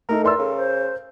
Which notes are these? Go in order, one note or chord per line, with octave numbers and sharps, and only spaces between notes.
A3 D#4 A4 A#4
E3 A#4 D5 C6 E6
C#3 A4
C5